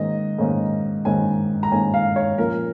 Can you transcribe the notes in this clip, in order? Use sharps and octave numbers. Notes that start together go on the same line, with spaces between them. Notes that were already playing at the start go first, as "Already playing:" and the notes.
Already playing: G#2 D#3 A#3 C#4 D#5
G#2 D#3 A#3 C#4
G#2 D#3 A#3 C#4 G#5
A#5
G#2 D#3 A#3 C#4 G#5
F5
C#5
A#2 F3 C#4 A#4